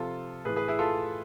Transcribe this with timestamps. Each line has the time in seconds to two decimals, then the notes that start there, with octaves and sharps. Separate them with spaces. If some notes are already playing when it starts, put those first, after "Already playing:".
Already playing: C3 F3 F4 A4
0.45 A2 G#4 B4
0.48 E3
0.56 G#4 B4
0.68 E4 G#4
0.79 F4 A4